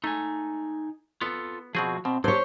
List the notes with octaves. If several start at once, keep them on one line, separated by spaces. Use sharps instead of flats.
A3 D#4 G#5
B3 F4 A4
B2 F3 C4 F#4 G#4
B2 C4
F#3 D4 G4 C5 C#5